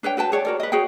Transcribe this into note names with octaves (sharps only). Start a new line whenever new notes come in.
D4 B4 C#5 G5
F#4 B4 G5 A5
G#4 C#5 D5
F#4 A#4 D5
B4 D#5
F#4 G#4 C#5 G5